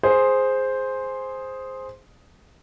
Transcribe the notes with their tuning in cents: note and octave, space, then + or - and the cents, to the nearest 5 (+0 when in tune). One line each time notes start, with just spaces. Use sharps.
G#4 +0 C5 +0